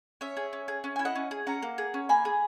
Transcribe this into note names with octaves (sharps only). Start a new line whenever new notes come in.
C#4 C#5 E5
G#4
C#4
G#4
C#4
E4 G#5
D#5 F#5
C#4
G#4
C#4 F#5 A#5
A#3
G#4
C#4
A#3 G#5 B5
G#4